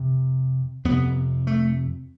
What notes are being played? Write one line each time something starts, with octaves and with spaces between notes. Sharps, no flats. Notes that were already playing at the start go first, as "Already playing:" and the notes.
Already playing: F2 C3
F2 C3 B3
A3